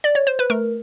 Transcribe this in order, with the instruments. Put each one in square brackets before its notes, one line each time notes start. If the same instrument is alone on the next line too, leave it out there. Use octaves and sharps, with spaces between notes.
[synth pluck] D5
C#5
C5
B4
A3 A#4